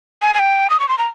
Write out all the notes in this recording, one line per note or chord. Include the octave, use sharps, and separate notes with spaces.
G#5
G#5
G5
D#6
C#6
C6
A#5